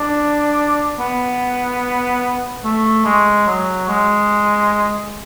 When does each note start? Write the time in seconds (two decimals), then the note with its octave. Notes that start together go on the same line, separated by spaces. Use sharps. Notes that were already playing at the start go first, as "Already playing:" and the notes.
Already playing: D4
0.99 B3
2.64 A3
3.05 G#3
3.46 F#3
3.88 G#3